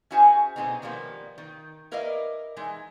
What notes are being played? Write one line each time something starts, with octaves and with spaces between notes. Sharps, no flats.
C#4 E4 F#4 G#4 C5 G#5
B2 D3 G#3 B3 C4 D#4
D#3 F3 G3 A#3 B3
D#3
E4 A#4 B4 D5 D#5 F5
E3 G#3 D#4